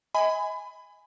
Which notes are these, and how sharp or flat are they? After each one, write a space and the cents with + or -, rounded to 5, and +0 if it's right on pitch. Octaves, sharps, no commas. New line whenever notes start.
D#5 +40 G#5 +0 B5 +35